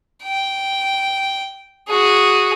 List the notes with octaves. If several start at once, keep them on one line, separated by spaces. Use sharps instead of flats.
G5
F#4 G#4